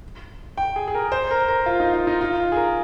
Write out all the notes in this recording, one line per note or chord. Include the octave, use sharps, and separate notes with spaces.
G5
G#4
G#4
A#4
C5
A#4
A#4
F4
D#4
F4
D#4
F4
G#4
A#4